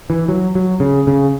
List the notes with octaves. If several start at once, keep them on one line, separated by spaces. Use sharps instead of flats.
E3
F#3
F#3
C#3
C#3